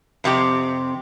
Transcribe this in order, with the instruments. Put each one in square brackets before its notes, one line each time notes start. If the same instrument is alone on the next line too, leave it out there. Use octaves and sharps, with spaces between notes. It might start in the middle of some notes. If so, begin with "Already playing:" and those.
[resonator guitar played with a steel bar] F2 C3 C4 G4